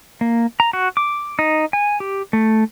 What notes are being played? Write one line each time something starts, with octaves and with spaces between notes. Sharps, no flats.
A#3
A#5
F#4
D6
D#4
G#5
G4
A3